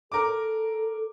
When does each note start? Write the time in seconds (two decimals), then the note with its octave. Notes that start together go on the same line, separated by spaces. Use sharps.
0.12 A4 A#4 D6